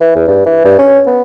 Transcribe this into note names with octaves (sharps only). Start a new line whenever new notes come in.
E3
E2
G2
E3
G2
C#4
B3